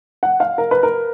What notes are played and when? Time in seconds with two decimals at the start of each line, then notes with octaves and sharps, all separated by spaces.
0.23 F#5
0.40 F5
0.58 A#4
0.71 B4
0.83 A#4